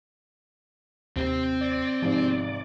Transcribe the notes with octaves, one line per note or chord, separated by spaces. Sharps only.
D#2 C3 C4 C5
D5
G#1 G#2 C3 F3